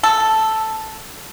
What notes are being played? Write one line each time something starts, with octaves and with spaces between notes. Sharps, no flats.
A4